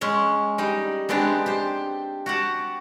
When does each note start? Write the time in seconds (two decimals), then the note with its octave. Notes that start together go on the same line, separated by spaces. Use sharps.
0.01 G#3 C#4
0.58 G3 D#4
1.09 G#3 B3 C4 D4 G4
1.46 G4 C5
2.26 F#4 G4 F#5 A5